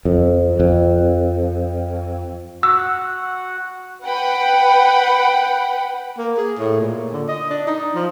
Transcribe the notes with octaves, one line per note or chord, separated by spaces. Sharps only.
F2
F2
F#4 F#5 E6
B4 F#5 G5 B5
A#3
G#4
A2
A#2
D3
D#5
D4
D#4
F3